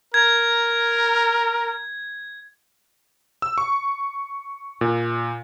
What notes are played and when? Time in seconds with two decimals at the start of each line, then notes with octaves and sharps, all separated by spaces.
0.14 A#4 G#6
3.42 E6
3.58 C#6
4.81 A#2